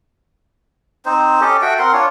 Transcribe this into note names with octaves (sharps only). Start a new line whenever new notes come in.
C4 D#4 C5
C#4 G4 A4 D#5
F#4 A4 E5 G5
C4 A#4 F#5 C6
D4 F4 C#5